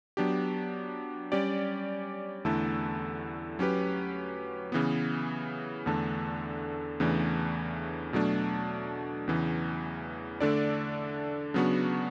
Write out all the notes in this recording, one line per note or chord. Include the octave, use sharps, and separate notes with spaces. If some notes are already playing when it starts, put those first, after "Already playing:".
F#3 B3 D4 G4
G3 C#4 G4 D5
E2 D3 A3 E4 A4
F#3 C#4 G4 B4
C#3 E3 B3
E2 D3 A3 D4 A4
E2 C#3 E3 A3 D4
B2 F#3 A3 D4
E2 C#3 E3
D3 A3 D4 A4 D5
C#3 F#3 B3 D4 F#4